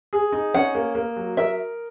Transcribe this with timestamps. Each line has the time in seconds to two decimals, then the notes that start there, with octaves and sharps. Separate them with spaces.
0.13 G#4
0.32 D#4
0.54 C#4 F#5
0.75 A#3
0.95 A#3
1.16 F#3
1.37 A#4 E5